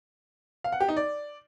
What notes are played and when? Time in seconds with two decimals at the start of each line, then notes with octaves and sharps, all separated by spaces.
0.64 F5
0.72 F#5
0.80 G4
0.88 D#4
0.96 D5